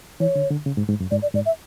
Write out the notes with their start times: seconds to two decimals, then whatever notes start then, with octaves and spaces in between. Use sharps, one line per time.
0.20 E3 C#5
0.36 D3
0.51 D3
0.66 C#3
0.77 G#2
0.89 G#2
1.00 F#2
1.11 G#2 D5
1.22 D5
1.34 G#2 D5
1.46 E5